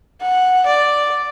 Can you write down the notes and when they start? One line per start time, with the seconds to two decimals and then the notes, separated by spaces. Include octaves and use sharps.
0.21 F#5
0.66 D5